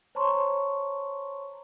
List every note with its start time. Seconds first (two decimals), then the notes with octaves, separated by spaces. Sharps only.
0.15 C5 C#5 A5 A#5 C6 C#6